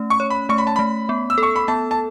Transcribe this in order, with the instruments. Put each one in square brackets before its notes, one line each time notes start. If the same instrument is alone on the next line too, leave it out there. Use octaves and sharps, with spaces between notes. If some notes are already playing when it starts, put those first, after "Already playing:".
Already playing: [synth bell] A3 C#4
[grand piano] C#6
[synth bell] C#5
[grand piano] B5
[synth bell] A3 [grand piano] C#6
[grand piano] B5
A5
[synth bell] A3 [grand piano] B5
[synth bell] B3
[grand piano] E6
[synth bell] A4
[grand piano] C#6
B5
[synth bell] B3 [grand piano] A5
[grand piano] A5